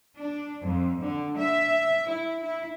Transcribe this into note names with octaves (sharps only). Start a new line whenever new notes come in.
D4
F2
D3
E5
E4
E4